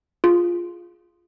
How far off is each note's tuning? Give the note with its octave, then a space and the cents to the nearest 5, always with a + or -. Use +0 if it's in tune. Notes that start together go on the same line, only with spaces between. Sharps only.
F4 +0 G#4 +0